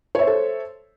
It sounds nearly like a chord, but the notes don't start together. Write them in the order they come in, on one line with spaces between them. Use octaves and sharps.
C#5 E5 C5 A4